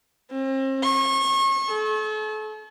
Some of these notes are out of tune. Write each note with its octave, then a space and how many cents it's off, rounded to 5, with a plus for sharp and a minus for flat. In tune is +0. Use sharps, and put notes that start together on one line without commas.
C4 +40
C#6 -35
A4 -40